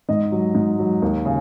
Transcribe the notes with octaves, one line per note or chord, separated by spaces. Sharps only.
G#2 D#5
F#3
G#2
F#3
D#2
C#3